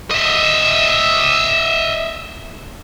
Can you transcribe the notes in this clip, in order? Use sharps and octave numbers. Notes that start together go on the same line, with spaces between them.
D#5 E5